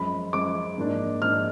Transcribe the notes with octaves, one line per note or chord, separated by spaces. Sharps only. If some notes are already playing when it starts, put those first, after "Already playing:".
Already playing: F#2 F3 G#3 B5
F#2 F3 G#3 D6
G#2 F3 A#3 D4
G#2 F3 A#3 D4 F6